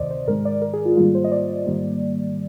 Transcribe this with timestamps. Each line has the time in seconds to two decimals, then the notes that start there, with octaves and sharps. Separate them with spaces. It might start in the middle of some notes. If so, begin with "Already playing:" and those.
Already playing: D2 C3 D#3 C5 D5 D#5
0.11 C5
0.28 G#2 D#3 G#3 A#4
0.45 D5
0.62 A#4
0.73 G#4
0.85 F4
0.97 G#2 D#3 G3 A#3 F4
1.15 C5
1.24 D#5
1.32 D5
1.66 G#2 D#3 G3 A#3